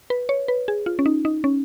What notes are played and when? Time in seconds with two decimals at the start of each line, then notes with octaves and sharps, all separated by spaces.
0.10 B4
0.29 C#5
0.48 B4
0.68 G#4
0.86 F4
0.99 C#4
1.06 D#4
1.25 D#4
1.44 C#4